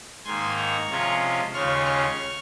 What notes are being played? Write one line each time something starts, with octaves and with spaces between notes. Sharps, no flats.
G#2 D#3 A#3 G#5 C6
A#5 C#6
C3 F3 G#3 C#4 F4
D#2 C#3 G#3 C#4 F4 C#6 F6
C#6 F6